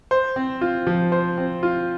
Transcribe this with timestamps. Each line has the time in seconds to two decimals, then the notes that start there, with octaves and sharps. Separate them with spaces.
0.11 C5
0.36 C4
0.61 F4
0.87 F3
1.12 C5
1.38 C4
1.63 F4